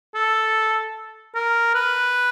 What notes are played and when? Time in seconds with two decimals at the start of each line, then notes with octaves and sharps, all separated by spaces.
0.15 A4
1.35 A#4
1.75 B4